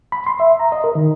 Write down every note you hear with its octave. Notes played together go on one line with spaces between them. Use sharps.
B5
C6
E5
A#5
D#5
A#4
D#3